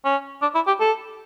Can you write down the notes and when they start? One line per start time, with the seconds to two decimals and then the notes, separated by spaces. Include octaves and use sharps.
0.05 C#4
0.42 D4
0.55 E4
0.67 G4
0.80 A4